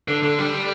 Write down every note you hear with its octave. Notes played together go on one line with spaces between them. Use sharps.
D3
D3
G3